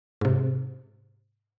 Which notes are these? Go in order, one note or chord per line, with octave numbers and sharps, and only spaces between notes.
G#2 C3